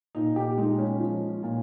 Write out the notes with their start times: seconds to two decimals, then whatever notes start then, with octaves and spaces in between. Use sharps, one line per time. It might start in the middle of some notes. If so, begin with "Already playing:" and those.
0.15 A#2 D#4
0.36 G4
0.58 G#3 D#4
0.78 C#4
1.00 F3
1.43 A#2